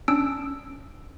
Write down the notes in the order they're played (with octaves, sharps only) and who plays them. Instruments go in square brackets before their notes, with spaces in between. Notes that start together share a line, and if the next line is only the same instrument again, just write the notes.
[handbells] C#4 D4 E6 D7